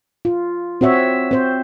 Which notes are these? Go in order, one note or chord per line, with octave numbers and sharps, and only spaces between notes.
F4
C4 F#4 C#5 E5
C4 C5